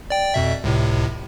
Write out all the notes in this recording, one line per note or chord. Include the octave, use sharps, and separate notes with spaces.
D5 G5
F2 B2 E5
C#2 A2 C3